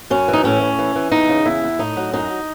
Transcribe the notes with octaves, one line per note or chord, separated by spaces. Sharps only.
F#2 C#4
E3
D#4
A2 C#4
A2
E3
E3
E2 D#4
C#3
E2 E4
E2
A2 D#4
F#3
F#2 D#4